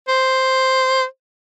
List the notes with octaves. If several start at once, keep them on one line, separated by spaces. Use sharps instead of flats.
C5